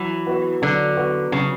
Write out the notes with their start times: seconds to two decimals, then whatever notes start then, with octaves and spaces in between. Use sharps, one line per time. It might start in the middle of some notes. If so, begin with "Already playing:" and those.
Already playing: E3 F#3
0.27 B3 F#4 B4
0.62 D3 F#3
0.97 B3 F#4 B4
1.32 C#3 F#3